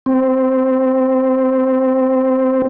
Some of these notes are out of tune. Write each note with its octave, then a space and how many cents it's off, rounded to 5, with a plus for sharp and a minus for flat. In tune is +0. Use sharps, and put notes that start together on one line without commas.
C4 -5